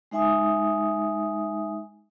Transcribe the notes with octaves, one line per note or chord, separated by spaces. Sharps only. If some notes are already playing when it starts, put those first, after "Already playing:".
G#3 D#4 E5 G#5 D#6